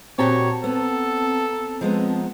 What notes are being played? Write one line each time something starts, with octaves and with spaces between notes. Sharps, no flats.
A#2 C4 F#4 G4 C#5 A5 A#5
B3 A4
F3 G#3 B3